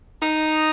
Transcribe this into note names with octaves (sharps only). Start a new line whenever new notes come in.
D#4